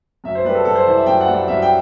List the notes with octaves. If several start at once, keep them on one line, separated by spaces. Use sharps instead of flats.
F#2 E5
C5
G3 B4
A4
F#2 A4
C5
E3 C5
E5
F#2 G5
F#5
G3
F#5
F#2 E5
G5